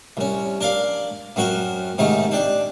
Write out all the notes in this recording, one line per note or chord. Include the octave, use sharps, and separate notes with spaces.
C2 C#4
D4 A#4 D5 F5
F#2 C4 F#4 A#4
G#2 C3 D#3 A3 C#4 D#4
C4 D4 G4